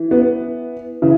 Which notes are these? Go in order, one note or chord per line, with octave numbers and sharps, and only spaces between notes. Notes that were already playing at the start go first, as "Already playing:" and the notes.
Already playing: E3
B3
C#3 E3